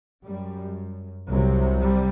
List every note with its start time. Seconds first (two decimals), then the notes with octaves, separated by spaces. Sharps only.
0.23 F#2 G3
1.28 C2 C3 F#3
1.81 G3